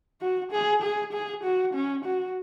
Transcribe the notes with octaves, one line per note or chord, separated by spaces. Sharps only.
F#4
G#4
G#4
G#4
F#4
C#4
F#4